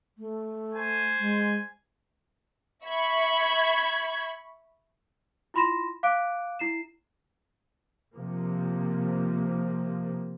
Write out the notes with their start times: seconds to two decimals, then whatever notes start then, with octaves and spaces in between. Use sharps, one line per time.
0.18 A3
0.74 C5 G#5
1.19 G#3
2.85 E5 B5 C#6 G#6
5.54 E4 F4 B5 C6 A#6 E7
6.03 F5 D6 F#6 D7
6.59 E4 C7 E7
8.14 C3 F3 A#3